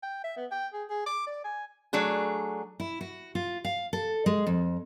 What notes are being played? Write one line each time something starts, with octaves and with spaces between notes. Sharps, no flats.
G5
E5
B3
G5
G#4
G#4
D6
D5
G#5
F#3 A3 D4 G#4
E4
F#4
F4
F5
A4
G#3
F2